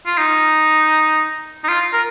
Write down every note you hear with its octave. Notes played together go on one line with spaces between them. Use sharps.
F4
D#4
D#4
F4
A#4